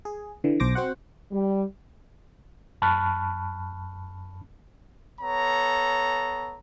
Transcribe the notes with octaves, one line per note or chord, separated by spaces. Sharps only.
G#4
D3 E3
B1 C5 D6 A#6
C4 F#4 C5 F#5
G3
F#2 A5 B5 C#6 F6 F#6
B3 A4 C#5 A#5